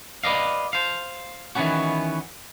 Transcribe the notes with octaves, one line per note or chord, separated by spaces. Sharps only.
B4 D5 D#5 F5
C5 F5
D#3 E3 A#3 B3 C#4 F#4